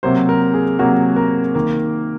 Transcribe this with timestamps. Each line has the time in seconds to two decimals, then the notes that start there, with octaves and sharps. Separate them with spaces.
0.03 C3 F#3 A#3 C5
0.29 A#4
0.53 G#4
0.79 C3 F#3 A#3 F#4
1.16 A#4
1.55 D#3 A#3